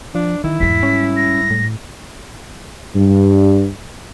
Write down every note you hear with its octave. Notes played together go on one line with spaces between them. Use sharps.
F3 D4
D#3 E3 E4
E2 G#2 G3 B6
C#4
A#6
A2
G2